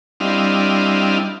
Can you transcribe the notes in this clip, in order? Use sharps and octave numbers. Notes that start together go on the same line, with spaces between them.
G3 C4 D4 E4 D#5 F5